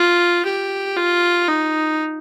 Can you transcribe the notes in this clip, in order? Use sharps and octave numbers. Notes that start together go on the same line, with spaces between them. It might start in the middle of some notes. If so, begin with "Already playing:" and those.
Already playing: F4
G4
F4
D#4